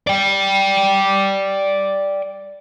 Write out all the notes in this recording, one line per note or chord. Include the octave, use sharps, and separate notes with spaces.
D5 G5